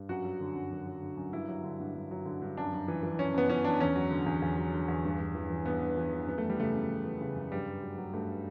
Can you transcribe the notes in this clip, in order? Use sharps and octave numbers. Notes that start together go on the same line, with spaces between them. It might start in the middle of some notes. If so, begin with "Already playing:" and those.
Already playing: G2
F#2 F#4
F#3
D3
F#2
F#2
F#3
D3
F#2
G2 E4
F#3
D3
G2
G2
F#3
D3
G2
F#2 D4
F#2
E3
E3
F#2 C#4
F#2 B3
E3 C#4
E3 D4
E2 C#4
F#3
D3
E2
E2
F#3
D3
E2
G2
G2
E3
E3
G2 B3
G2
E3
E3
F#2 B3
A3
E3
G3
C#3 A3
F#2
F#2
E3
C#3
F#2
G2 G3
G2
F#3
F#3
G2 A3